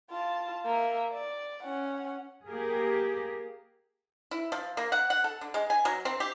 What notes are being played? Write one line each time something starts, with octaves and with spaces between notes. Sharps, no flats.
F4 A5
A#3 E5
D5
C#4 F#5
A#3 G4 G#4 A#4
E4
F3
A#3
F#5
F#5
A4
D3
G#3
G#5
F#3
C4
G4